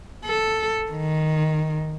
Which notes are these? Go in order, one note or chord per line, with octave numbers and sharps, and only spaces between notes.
A4
D#3